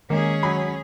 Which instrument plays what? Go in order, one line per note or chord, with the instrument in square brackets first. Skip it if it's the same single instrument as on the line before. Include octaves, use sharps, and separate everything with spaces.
[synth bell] D#3 G#3 [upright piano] A#3 [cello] C#4 G#4
[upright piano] F#3 B5